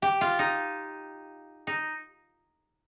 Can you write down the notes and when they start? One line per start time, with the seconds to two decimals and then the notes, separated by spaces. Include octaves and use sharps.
0.02 G4
0.21 F4
0.39 D#4
1.67 D#4